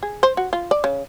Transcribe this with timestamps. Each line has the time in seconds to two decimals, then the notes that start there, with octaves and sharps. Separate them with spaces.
0.03 G#4
0.23 C5
0.37 F#4
0.53 F4
0.71 D5
0.84 C#3